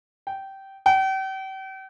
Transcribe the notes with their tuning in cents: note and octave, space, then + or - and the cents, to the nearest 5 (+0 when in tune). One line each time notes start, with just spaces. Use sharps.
G5 -15
G5 -40